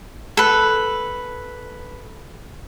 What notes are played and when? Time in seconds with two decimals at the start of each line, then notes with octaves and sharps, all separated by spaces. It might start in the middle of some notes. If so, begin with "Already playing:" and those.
0.37 A4 B4